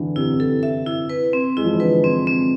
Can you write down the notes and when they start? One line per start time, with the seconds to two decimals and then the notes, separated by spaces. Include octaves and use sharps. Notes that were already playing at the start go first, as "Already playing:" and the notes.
Already playing: D3 E3
0.16 C3 E4
0.25 D3
0.33 C3
0.40 A4
0.63 E5
0.86 E4
1.10 B4
1.33 C4
1.57 G#3 E4
1.65 F3
1.73 E3
1.80 D3 B4
2.04 C4
2.27 C4